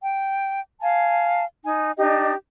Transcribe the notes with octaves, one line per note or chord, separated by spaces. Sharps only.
G5
F5 G#5 A5
D#4 G#5
D4 D#4 G4 D#5